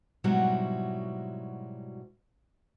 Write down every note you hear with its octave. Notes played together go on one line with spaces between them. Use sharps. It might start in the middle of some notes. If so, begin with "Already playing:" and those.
G#2 B2 F#3 G3 E4 F#4